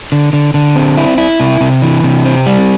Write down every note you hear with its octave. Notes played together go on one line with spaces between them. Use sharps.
D3
D3
D3
C4
E4
E4
C3
C3
E3
C3
C4
G3